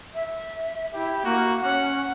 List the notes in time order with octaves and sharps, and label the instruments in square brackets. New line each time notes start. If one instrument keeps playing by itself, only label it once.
[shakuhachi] E5
[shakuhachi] E4 [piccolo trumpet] G4
[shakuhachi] A#3 [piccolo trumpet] F#4
[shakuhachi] C#4 [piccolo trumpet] F#5